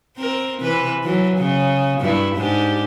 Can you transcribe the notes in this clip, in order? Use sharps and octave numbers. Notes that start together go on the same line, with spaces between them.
C4 A#4
C3 E3 B4
E3 F#3
C#3
G2 E4
G#2 D4 G4